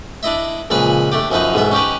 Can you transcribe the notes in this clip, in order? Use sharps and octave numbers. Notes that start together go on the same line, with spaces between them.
D4 E4 D#5 E5
C#2 A#2 F3 G#4 B4 B5
A3 D4 G4
F#2 F3 D#4 B4
B1 G#2 B3 E5
C#4 D#4 G4 B4